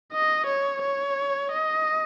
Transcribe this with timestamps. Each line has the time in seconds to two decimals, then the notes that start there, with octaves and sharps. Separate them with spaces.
0.13 D#5
0.47 C#5
0.82 C#5
1.52 D#5